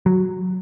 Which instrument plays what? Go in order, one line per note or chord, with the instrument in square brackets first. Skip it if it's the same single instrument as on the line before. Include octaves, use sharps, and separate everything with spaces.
[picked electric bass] F#3